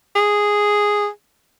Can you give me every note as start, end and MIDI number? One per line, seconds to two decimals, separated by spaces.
0.16 1.08 68